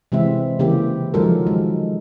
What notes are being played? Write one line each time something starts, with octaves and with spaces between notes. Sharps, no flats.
C3 E3 G#3 C4 E5
C#3 E3 A#3 G4
D#3 F3 F#3 G#3 A4 A#4
G#3